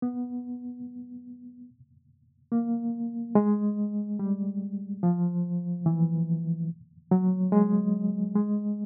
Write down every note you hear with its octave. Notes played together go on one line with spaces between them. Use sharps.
B3
A#3
G#3
G3
F3
E3
F#3
G#3
G#3